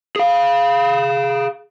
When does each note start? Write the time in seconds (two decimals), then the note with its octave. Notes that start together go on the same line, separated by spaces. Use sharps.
0.16 G#4 F5